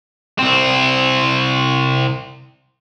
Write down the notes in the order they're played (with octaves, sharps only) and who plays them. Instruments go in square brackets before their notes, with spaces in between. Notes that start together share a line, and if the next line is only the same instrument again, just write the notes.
[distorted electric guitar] C2 C4